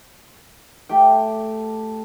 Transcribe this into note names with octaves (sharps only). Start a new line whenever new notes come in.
A3 G4 G5